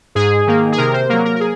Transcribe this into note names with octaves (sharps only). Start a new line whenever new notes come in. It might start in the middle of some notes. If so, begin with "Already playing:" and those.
G#2 G#4
D#3 A#3
G#4
C3 A#4
C5
F#3 A#3 A#4
A#4
A#4
G#4